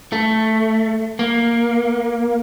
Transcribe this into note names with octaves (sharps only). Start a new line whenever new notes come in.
A3
A#3